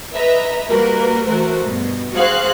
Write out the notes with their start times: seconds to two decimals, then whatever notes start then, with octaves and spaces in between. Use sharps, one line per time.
0.14 B4 D#5 E5 A#5
0.70 G3 A#3 F#4 A#4 B4
1.26 E3 A3 F#4 A#4 C5
1.62 G2 B2
2.13 F#4 G#4 C5 F5 C6 F#6